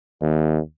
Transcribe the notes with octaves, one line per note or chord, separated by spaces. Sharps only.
D#2